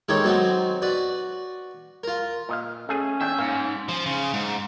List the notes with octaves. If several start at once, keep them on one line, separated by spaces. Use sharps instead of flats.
D#3 G#3 D#4 G4 A4 C#5
F#3 B3 C4 D#4 F#4
F#4 B4 D5
F4 A#4
A#2 D#5 F5
A3 C#4 G#4
E2 D4 E5 G5
G#2 A#3
F3
C#3
G#2